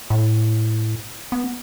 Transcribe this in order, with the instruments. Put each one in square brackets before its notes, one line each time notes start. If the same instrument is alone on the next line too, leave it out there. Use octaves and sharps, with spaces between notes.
[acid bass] A2
B3